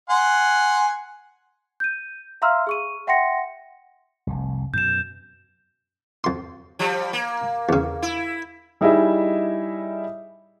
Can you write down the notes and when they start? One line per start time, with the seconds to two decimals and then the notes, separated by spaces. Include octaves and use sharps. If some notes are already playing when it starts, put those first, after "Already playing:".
0.09 F#5 G#5 C6
1.80 G6 D#7
2.42 E5 F5 A#5 C6 E6 F6
2.67 G#4 C#6 D#7
3.07 E5 F#5 G5 C6 A#6 C#7
4.27 F1 C2
4.74 F#2 B2 G6 E7
6.24 F2 C6
6.79 F3 G3
7.13 A#3
7.69 E2 C#3
8.02 E4
8.81 G3 D#4 E4 G#4 D#5 E5